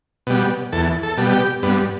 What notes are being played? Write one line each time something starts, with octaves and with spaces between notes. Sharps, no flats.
B2 G3
E2 A4
A4
B2 G3
G4
G2 B3